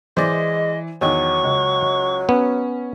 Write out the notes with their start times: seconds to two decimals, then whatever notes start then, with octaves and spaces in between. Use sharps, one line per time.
0.17 E3 G#3 C5 D5 D#5
1.01 E2 D#3 F#3 C#6
1.43 C#2
2.29 B3 C#4